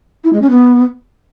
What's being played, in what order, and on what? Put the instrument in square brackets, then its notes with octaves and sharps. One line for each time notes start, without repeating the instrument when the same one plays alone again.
[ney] E4
G#3
C#4
B3